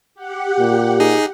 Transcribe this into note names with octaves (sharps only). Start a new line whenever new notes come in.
G4 F#5
A#2
D#4 G#4